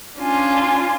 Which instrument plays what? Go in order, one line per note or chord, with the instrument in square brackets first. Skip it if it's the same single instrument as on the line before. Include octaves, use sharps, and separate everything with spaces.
[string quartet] C#4 D4 F4 G#5